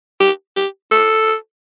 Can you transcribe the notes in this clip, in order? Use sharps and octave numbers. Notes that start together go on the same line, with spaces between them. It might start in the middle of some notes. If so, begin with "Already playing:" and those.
G4
G4
A4